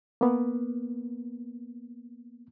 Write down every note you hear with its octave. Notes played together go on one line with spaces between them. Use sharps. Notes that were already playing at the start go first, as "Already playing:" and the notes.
A#3 B3